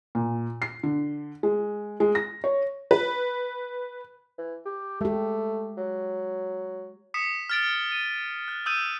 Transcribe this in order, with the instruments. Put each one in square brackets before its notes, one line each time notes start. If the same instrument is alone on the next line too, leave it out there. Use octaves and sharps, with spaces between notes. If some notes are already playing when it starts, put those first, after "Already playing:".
[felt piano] A#2
C7
D3
G#3
G#3
A#6
C#5
[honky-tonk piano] B4
[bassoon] E3
G4
[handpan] G#3 G4 [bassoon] A3
[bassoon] F#3
[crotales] D#6 B6 C#7 E7
F6 A6 D7
D#7
F#6
D#6 E6 G6 D#7